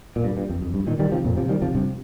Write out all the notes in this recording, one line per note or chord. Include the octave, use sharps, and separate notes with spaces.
A#2
G2
G2
F2
F2
G2
A#2 D#3
D#3 G3
C3 F3
F2 A#2
C3 F3
D#3 G3
C3 F3
G2 C3